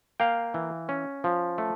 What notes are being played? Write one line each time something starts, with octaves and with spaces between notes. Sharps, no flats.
A#3 F5 G5
E3
C#4
F3
A3